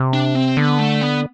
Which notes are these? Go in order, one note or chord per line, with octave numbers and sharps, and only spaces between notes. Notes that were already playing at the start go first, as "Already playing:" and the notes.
Already playing: C3
D4
C4
D3 B3
A3
B3